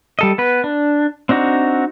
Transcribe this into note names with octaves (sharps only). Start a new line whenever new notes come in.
G3 A4 D#5
B3 B4
D4
C4 D4 D#4 F#4